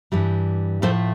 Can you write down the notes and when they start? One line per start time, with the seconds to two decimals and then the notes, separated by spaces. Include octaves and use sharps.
0.12 G2 E3 G3
0.82 A2 F3 A3 A4 C5